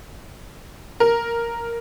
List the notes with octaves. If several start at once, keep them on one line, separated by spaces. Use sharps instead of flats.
A#4